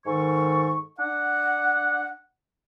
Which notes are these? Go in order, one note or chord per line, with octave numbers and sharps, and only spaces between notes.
G#2 D#3 A4 C#6
D4 F#5